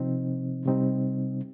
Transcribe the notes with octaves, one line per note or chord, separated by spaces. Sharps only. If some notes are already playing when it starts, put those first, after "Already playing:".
Already playing: C3 F3 C4 D#4
C3 G3 C4 D#4